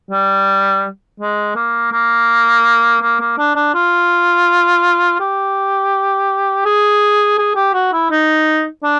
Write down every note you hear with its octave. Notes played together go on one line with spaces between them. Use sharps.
G3
G#3
A#3
A#3
A#3
A#3
D4
D4
F4
G4
G#4
G#4
G4
F#4
E4
D#4
D4